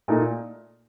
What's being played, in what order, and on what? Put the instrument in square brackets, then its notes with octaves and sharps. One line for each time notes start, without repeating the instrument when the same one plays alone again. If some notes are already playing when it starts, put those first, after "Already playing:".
[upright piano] A#2 A3 D#4